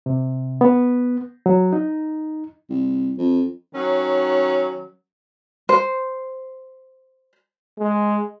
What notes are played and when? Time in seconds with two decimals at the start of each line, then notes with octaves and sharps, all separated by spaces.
0.06 C3
0.61 B3
1.46 F#3
1.73 D#4
2.70 C2
3.18 F2
3.73 D#3 F#3 C#4
5.69 C5
7.79 G#3